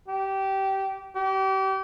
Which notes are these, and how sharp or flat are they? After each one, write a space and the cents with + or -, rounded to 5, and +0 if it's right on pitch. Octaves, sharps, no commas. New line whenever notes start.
G4 -20
G4 -35